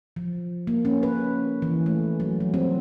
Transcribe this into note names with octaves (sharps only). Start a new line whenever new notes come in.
F3
A#3
C#4
B4
E3
A3
F#3
F3
C4